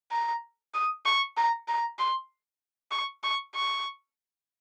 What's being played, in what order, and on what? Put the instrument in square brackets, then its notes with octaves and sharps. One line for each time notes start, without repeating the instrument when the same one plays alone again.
[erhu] A#5
D#6
C#6
A#5
A#5
C6
C#6
C#6
C#6